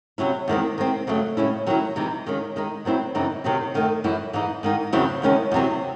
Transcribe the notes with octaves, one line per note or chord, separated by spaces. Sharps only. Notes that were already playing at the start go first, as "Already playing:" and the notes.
C3 F#3 C#4 E4
E2 D#3 G#3 C4
D#3 G#3 C4
F#2 C#3 F#3 A3
A2 G#3 C#4 E4
D#3 F#3 C#4 E4
C3 E3 G#3 D#4
D#2 D#3 G#3 C#4
D#3 G#3 D#4
D#3 F#3 C4 E4
F#2 C#3 E3 C4 D#4
C3 D#3 F#3 C4
F#2 D#3 A3
F#2 E3 G#3 C#4 E4
G#2 E3 G#3 D#4
G#2 D#3 G#3 D#4
E2 C#3 F#3 C4 E4
E2 D#3 G#3 C#4 E4
E2 C3 F#3 C4